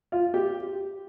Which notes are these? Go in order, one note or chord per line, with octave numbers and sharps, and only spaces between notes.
F4
G4